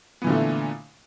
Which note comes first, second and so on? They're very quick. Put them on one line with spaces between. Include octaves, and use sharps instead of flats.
B3 E3 D3 A#2 A3